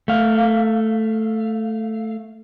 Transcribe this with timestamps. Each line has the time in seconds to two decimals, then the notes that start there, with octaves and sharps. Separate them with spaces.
0.08 A3 F5